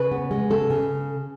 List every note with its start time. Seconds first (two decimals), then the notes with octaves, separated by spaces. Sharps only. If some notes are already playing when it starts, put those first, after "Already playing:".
Already playing: C#3 B4
0.11 B3
0.31 G#3
0.50 C#3 A4
0.70 C#3